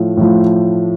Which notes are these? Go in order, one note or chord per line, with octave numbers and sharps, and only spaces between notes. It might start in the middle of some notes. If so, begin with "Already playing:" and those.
Already playing: A2 F3
A2 F3